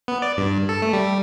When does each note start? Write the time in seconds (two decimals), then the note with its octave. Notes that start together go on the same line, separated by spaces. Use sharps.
0.08 B3
0.22 D5
0.37 G2
0.69 A4
0.82 A3
0.93 G3